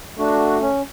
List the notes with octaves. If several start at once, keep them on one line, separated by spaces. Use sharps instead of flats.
A3 D4 F#4
C#4